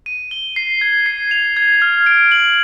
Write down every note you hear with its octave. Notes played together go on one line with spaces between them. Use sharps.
D#7
G7
C7
G#6
C7
F7
G#6
F6
D7
F#7